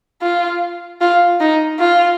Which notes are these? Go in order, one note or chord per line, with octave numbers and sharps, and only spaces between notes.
F4
F4
D#4
F4